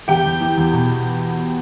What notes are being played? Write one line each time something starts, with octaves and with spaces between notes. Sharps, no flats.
E2 G4 G5
E2
E3
E2
B2